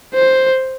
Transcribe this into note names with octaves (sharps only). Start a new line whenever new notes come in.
C5